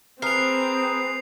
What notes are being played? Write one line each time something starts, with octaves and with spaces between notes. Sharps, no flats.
C4 G#4 A#4 B4 C7 F7